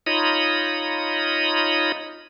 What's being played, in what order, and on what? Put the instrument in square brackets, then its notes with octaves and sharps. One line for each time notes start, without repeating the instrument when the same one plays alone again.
[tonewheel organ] D#4 F4 C#5 D#5 B5 D#6